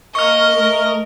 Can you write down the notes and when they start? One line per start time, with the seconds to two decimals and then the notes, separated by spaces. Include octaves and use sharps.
0.15 A#3 D#5 C#6 F6
0.58 A3 A#4